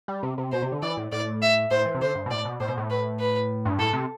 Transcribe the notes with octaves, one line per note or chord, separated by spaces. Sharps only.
G3
C3
C3
B2 C5
C3
D3
E3 D5
A2
A2 D5
E5
A2 C5
E3
C3
D3 C5
G2
B2
A2 D5
B2
A2 C5
B2
A2
B4
B4
G2
A2 A4
C3